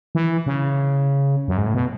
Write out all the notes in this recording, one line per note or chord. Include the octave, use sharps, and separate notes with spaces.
E3
C#3
F#2
G#2
A2
B2